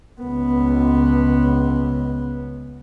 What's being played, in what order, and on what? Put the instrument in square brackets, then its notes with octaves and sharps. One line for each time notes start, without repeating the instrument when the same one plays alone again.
[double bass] C#2 B3